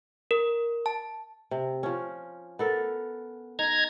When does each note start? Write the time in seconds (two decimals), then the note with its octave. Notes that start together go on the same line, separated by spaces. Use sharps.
0.31 A#4
0.86 A5
1.51 C3
1.83 F3 C#4
2.59 B3 A4 A#4
3.59 D#4 A#5 G#6